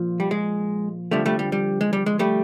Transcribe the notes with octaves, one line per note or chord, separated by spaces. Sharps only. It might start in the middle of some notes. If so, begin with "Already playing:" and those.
Already playing: A#2 F3
G3
G#3
F2 D3 F3 G3 A3
G3 A3
G3
G3
G#3
G3
G#3
G3 A3